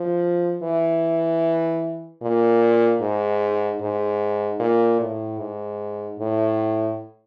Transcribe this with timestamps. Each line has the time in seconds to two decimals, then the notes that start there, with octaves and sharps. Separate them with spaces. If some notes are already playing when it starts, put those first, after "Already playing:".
Already playing: F3
0.63 E3
2.22 A#2
3.01 G#2
3.81 G#2
4.60 A#2
5.00 A2
5.39 G#2
6.19 A2